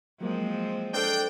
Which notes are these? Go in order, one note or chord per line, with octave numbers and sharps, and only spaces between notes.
F3 F#3 G#3 A#3 C4
D4 A4 C5 F5 G5